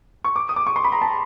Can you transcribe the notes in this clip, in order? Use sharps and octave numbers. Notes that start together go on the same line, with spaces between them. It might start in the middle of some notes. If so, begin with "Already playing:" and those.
C#6
D6
D#6
D6
C#6
C6
B5
A#5
A5